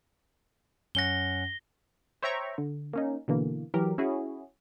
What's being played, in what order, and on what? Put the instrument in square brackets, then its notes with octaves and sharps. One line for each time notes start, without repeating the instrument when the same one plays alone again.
[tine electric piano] F#2 C#4 F#5 [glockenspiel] A#6 G7
[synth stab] C5 C#5 E5 G5 A#5 C#6
D3
A#3 C#4 D#4
B2 D3 E3 A#3
E3 F#3 G4 A#4
C#4 E4 F#4 G#4